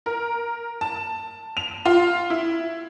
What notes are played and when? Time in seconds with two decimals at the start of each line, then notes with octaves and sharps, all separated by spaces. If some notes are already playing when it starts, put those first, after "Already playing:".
0.06 A#4
0.81 A5
1.57 F7
1.85 F4
2.30 E4